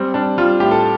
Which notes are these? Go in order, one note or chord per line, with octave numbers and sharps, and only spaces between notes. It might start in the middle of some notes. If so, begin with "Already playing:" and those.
Already playing: G3 C4
G3 D4
G3 F4
A2 G4
A4